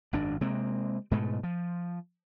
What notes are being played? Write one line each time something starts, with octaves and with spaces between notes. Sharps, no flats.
G#1 F#2 D4
C3 G#3 A#3 C4
G#2 B2 G#3 A3
F3